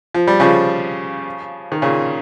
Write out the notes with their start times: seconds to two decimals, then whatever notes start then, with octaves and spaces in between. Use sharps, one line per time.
0.14 F3
0.27 G3
0.40 C#3 F3
1.72 D#3
1.82 A#2 C#3